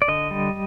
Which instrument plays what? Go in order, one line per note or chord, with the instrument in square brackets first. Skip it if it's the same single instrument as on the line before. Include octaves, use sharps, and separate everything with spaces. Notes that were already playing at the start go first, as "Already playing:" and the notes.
[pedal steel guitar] D5
D3 D#5
G3